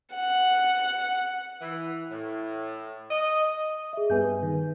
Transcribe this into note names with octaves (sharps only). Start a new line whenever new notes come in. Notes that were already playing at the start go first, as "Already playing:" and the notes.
F#5
E3
A2
D#5
G#4 E5
G2 G3 B3 B4 G#5 G6
D#3